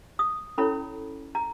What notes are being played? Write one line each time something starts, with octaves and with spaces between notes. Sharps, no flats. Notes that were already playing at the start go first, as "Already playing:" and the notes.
D#6
C#4 E4 A4 C#5 B5
A#5